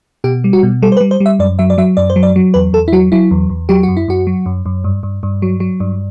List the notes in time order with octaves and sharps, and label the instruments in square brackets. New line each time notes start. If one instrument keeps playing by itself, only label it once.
[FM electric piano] B2 G4
G3
F#4
B2
G3 A4
C5
B4
G3
C5
G3
E5
F#2 D5
F#3 E5
D5
F#3 E5
F#2 D5
C5
F#3
D5
F#3
E2 B4
E2 A4
E4
F#3 F#4
F#3 E4
E2
E2
F#3 G4
F#2 F#4
E4
F#2 F#4
F#3
F#2
F#2
G2
G2
G2
F#3
F#3
G2